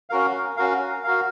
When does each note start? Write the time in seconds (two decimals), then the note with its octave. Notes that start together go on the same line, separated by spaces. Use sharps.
0.10 C#4 F#4 A#4 F5
0.57 C#4 F#4 A#4 F5
1.04 F#4 A#4 F5